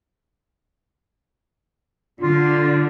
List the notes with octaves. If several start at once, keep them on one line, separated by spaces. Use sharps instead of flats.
D3 F4